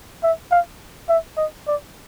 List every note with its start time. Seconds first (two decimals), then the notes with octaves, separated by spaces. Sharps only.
0.23 E5
0.51 F5
1.09 E5
1.37 D#5
1.67 D5